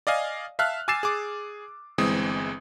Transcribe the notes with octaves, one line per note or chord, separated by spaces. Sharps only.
D5 D#5 F5 G#5
E5 F5 A5 F6 F#6
G#5 D6 E6 A6 C7 E7
G#4 D6
G1 E3 G#3 C4 D#6